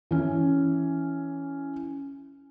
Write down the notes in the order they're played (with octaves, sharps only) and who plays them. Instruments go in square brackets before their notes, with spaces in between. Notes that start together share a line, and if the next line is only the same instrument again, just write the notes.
[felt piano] E3 C#4